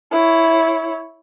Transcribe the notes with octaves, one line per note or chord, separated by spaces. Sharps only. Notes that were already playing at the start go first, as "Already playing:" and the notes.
E4 C#5